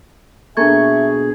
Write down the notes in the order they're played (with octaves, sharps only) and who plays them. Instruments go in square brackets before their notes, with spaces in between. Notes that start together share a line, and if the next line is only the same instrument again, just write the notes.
[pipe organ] B2 G#4 [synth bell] A#3 A4 C#6 [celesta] D4 G#6 [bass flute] E5